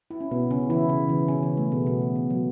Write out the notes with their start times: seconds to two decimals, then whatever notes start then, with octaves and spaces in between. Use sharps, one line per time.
0.10 E4
0.21 C#4
0.31 B2 B3
0.51 C#3 C#4
0.70 E3 E4
0.89 C#3
1.09 E3
1.28 C#3 C#4
1.43 E3
1.57 A3
1.72 B2 B3
1.86 B2 B3
2.01 A3
2.16 E3
2.30 F#3